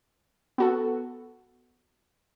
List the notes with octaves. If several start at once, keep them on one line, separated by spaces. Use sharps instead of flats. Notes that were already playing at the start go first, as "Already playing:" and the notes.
B3 F#4 A4